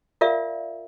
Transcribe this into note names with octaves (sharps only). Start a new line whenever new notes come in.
F4 A#4 D5 E5 F5